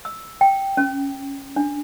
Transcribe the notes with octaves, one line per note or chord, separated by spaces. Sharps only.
E6
G5
C#4
D4